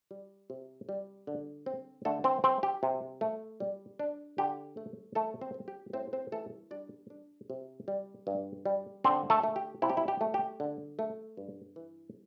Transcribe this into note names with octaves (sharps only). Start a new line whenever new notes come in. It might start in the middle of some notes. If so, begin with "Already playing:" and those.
G3
C3
G3
D3
C4
D3 A3 A4
C4 C5
C4 C5
G4
C3
A3
G3
D4
D3 G4
A3
A3 A4
C4 C5
C4
G4
A2 C4 C5
C4 C5
E3 A3 A4
G3 D4 D5
D4
C3
G3
G2
G3
D3 C4 C5
A3 A4
A3
G4
C3 E4
G4
E4
G4
A3
G4
D3
A3
G2
E3